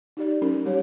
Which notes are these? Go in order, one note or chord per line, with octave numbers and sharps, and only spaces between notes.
D#4 G4 D5
F#3 C#4 A#4
G3 G4 C#5